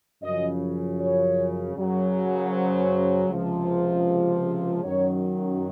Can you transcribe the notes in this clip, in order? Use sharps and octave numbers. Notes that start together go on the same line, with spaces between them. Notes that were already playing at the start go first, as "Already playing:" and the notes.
F#2 C#3 F3 D#5
C#5
F#2 C#3 F#3
C5
C#2 C3 F3
F#2 D#3 F#3 C#5